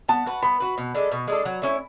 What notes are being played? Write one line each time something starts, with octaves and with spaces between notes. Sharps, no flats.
B3 A5
F#4 B4
B3 B5
F#4 B4
B2
G#3 D4 A4
B2
G#3 D4 A4
F#3
A3 C#4 E4